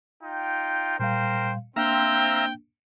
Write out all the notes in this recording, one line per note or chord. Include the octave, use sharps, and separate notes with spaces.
D#4 F4 G5
A#2 G3 A#4 C5 F5 G5
A#3 C4 D4 E5 F5 G5 A#5